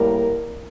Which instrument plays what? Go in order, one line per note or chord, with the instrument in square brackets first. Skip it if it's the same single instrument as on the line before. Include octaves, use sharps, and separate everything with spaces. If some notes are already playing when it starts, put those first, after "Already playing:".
Already playing: [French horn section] A2 G3 A#3 A#4